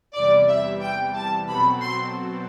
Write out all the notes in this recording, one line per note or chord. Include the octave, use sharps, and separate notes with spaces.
E2 C3 E3 G3 D5
E5
G5
A5
B2 F#3 C4 F#4 A4 B5
C6